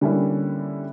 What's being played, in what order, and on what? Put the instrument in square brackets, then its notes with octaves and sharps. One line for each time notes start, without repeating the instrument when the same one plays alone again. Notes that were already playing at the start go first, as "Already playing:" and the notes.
[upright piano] D3 G3 A#3 C#4 E4